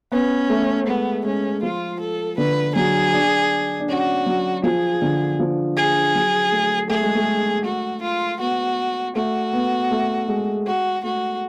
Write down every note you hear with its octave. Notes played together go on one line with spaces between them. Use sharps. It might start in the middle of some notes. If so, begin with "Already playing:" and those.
B3 C#4
A3
G#3 B3
G#3 C#4
F3 F4
A4
D3 B4
F#3 G#4
D4
D4
C#4 F#4
F#3
F3 G#4
D3
F3
G#4
F#3
A3
A3 G#4
G#3
A3
F#4
F4
B3 F#4
A3 F#4
B3
A3
G#3
F#4
A3 F#4